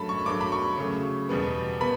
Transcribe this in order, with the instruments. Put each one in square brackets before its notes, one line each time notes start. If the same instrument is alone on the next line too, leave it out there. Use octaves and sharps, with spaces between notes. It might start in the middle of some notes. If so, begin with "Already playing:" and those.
Already playing: [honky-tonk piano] G2 F#3 A3 A5 B5
C#6
G2 F#3 A3 D6
B5
C#6
C#3 F#3 A3
E2 B2 G3 B3
B3 B5